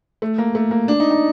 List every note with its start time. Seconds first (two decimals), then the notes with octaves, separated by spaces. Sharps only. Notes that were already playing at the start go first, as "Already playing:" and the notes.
0.22 A3
0.38 A#3
0.55 A3
0.71 A#3
0.88 D4
1.00 D#4
1.11 D#4